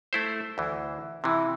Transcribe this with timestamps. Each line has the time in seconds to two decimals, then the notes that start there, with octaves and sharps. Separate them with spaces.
0.13 A3 E4 C5
0.58 D2 E3
1.24 C3 E3 E4